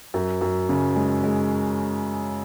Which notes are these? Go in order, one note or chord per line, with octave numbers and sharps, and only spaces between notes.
F#2
F#2
C#3
G#3
G#3